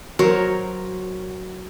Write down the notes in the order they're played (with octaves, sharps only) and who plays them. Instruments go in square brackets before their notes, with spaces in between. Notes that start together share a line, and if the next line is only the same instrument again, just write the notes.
[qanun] F#3 A#4 C5 C#5